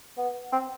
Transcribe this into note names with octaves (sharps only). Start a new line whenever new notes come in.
B3
C4